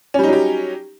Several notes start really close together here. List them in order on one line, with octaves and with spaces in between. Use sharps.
C#4 G3 D#4 F#3 G4